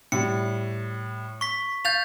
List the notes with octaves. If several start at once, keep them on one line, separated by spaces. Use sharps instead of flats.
A2 G3 C#7
C#6 B6
F5 G6 A6 F7